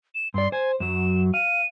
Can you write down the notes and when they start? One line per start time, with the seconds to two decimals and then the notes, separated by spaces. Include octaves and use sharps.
0.15 E7
0.34 G2 D5 C6
0.52 C5 G#5
0.80 F#2 F#3 E7
1.34 F5 D#7